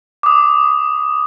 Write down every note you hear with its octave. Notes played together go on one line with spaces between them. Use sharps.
D6 D#6